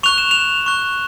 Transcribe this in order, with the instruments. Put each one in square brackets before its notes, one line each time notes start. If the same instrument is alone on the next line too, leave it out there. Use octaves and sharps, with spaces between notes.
[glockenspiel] C#6 F#6 F7
E7
F7
C#6 F#6